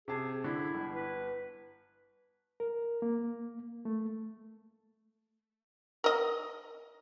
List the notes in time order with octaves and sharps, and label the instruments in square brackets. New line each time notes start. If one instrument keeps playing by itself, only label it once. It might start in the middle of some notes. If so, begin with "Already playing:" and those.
[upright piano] C3 A5 [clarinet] G#4
[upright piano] D3 [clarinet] E4
[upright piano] G1
[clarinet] B4
[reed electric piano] A#4
A#3
A3
[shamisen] A#4 D#5